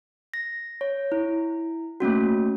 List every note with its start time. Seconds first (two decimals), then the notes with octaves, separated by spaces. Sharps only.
0.34 A#6
0.81 C#5
1.12 E4
2.00 A3 A#3 C#4 F#4